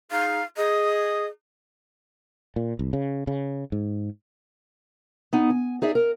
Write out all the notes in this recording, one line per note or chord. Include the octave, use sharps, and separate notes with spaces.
D#4 G#4 F5
G#4 D#5
A#2
C2
C#3
C#3
G#2
B3 D#4
G#5
D#4 G#4 D5 E5
A#4